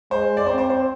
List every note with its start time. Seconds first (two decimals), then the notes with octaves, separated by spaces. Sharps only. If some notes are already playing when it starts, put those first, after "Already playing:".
0.11 G#3 C5
0.37 D5
0.46 C4 C5
0.58 C5
0.70 C5